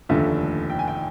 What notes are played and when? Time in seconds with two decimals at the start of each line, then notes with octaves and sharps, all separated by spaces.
0.09 F1 D#2 D3 F3 A3 E5
0.70 G5
0.79 G#5
0.88 G5